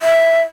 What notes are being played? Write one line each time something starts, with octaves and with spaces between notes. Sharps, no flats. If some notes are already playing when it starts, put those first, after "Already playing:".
E5